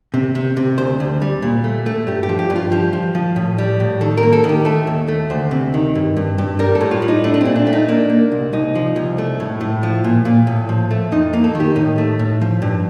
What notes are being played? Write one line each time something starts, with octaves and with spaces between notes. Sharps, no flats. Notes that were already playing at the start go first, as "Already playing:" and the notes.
C3
C3
C3
D2 C5
D2
G3
A#2
A3
A3
G2 G4
G4
F3
G4
G2
F4
F3 G4
F3
F3
A2
G3
A2
D#3 A4
A#4
A#3
A4
D#3
G4
A3 A4
D#2
A3
D2 C5
C3
D#3
G2
G2
G2
G3 A#4
A4
A2
F4
G3
D#4
A3 D4
D4
A#2 C4
D4
A3
D#4
A#3 D4
A#3
C2
C2 D#4
F3
C2
A3
A2
A2
F3
A#2
A#2
A2
F3
A3
F2 D#4
A#3
A4
D#3
G4
A2 D#4
A3
A2
F3
G2